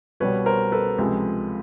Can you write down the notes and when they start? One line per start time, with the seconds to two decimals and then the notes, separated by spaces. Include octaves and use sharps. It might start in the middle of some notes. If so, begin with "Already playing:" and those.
0.20 C2 B2 G3 B4 C#5
0.46 A#4 C5
0.72 A4 B4
0.98 C#2 C3 F3 G#3